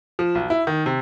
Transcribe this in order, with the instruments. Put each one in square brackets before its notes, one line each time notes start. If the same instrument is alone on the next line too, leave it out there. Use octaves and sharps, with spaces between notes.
[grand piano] F3
B1
E4
D#3
C3